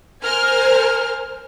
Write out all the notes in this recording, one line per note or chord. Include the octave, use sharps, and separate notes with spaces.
A#4 C5 G#5 F6